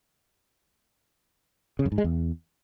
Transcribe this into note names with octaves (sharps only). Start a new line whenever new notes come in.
C#3
F#2
G#2
G#3
E2